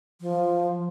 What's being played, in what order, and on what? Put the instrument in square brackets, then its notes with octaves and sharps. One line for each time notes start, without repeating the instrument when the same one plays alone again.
[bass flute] F3